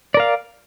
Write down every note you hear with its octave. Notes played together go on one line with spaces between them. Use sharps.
A#4 D5 F5